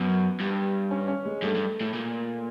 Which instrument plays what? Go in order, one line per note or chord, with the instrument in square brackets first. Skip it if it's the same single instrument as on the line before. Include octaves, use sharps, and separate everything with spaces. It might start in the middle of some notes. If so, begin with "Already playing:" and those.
Already playing: [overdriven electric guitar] F#2 [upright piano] B3
[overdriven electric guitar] G2
[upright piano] C#4
C#4
G#3
[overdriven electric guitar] G2 [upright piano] A3
[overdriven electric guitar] G2
A2
A#2